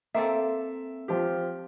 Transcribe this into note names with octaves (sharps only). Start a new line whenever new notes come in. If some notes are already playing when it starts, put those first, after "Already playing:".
A#3 C4 A4 E5
F3 G4